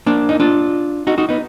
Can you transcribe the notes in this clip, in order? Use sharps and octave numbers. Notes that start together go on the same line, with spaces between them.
A#3 D4
D#4
D4 F4
D#4 F#4
D#4 F#4
B3 D#4